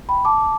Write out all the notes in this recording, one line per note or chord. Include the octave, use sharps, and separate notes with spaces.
G5 B5
A5 D6